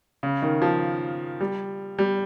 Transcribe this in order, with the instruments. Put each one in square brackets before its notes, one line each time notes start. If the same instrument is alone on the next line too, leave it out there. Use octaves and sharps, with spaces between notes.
[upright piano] C#3
D#3
F3
G3
G3